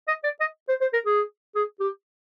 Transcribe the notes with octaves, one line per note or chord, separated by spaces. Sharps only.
D#5
D5
D#5
C5
C5
A#4
G#4
G#4
G4